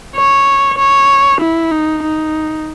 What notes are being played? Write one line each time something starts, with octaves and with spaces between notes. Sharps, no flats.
C#5
C#5
E4
D#4
D#4